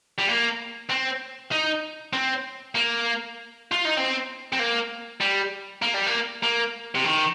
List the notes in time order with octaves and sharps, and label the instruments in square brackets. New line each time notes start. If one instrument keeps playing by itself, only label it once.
[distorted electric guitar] G3
A#3
C4
D#4
C4
A#3
F4
D#4
C4
C4
A#3
G3
A#3
G3
A#3
A#3
C3
D#3